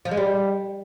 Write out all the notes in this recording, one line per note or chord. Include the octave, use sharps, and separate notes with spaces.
F3
G#3
G3